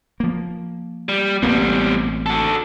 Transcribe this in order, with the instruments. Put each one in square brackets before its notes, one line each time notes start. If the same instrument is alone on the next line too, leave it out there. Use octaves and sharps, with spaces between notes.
[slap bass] F3 A#3
[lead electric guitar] G3
[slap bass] A1 A#3 C4 [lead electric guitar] B2 G3
[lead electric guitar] F#4 A4